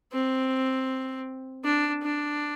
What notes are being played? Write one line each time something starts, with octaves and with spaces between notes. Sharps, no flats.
C4
D4
D4